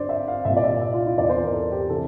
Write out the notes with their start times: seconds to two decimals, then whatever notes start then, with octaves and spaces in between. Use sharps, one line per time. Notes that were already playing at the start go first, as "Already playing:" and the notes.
Already playing: G2 D3 C5 D5
0.09 E5
0.28 F5
0.45 C2 A#2 E5
0.57 D5
0.64 E5
0.81 E5
0.94 F4
1.06 E4
1.17 E2 E3 D5
1.29 C5
1.42 A#4
1.53 A4
1.72 G4
1.90 C3 E3 A4